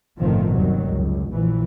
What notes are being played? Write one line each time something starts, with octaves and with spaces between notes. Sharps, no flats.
G1 A2 C3 D#3 F3 C4
D#2 D#3 F#3 G3
F1 C#2
A#1 E3